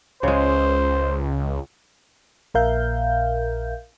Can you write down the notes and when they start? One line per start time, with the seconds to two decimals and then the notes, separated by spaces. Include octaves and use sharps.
0.23 C#2 C#3 G#3 C5
2.54 A#1 A#2 A#4 E5 F5 G6